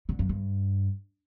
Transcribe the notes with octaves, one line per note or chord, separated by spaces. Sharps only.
D3
F#2
G2